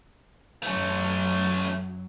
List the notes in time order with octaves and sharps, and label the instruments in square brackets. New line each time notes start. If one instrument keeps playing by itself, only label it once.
[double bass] F#2 F#3 [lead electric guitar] A3 C#4